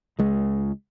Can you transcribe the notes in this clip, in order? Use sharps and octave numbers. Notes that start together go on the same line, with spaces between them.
C#2 G#3